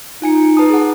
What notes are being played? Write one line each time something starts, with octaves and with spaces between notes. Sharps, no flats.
D#4 F4 G#5 C#7
B4 A5 D#6
G#4 F#5